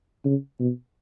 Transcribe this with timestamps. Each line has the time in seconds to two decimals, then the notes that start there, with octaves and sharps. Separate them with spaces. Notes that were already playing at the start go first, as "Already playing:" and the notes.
0.25 C#3
0.59 B2